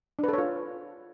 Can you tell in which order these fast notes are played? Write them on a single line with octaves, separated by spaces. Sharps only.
D4 B4 A4 C#5 F4